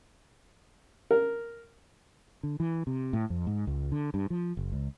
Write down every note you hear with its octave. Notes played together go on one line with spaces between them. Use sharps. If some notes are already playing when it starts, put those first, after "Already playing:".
A#4
D3
E3
C3
A2
F2
G#2
C#2
D3
G2
F3
F#1
C#2